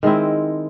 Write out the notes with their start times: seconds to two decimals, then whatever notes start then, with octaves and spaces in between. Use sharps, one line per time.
0.03 D#3 G#3 C4 E4